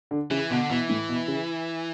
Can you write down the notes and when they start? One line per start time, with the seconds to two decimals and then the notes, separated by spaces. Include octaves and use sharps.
0.11 D3
0.31 C#3 E3
0.50 B2 D3
0.70 B2 E3
0.89 A2
1.09 B2
1.28 C#3